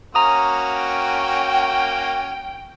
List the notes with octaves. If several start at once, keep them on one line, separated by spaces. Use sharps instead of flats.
A#3 C#4 F#4 A#5 D#6
G5